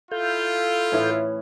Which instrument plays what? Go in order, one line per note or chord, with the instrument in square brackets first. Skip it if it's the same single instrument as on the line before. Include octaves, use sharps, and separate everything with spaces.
[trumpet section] E4 F4 [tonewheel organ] A4 F5 G6
[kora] A2 E3 C#4